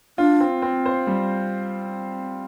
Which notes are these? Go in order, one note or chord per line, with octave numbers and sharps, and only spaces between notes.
D4 F4
C4
C4
C5
G3